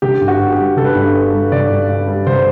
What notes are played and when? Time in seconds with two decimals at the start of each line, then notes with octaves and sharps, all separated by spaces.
0.02 D3 G4
0.21 G2
0.28 F#4
0.39 G2
0.52 G4
0.58 G3
0.77 D3 A4
0.85 B4
0.93 G2 A4
1.15 G2
1.33 G3
1.52 D3 D5
1.71 G2
1.89 G2
2.07 G3
2.27 D3 C5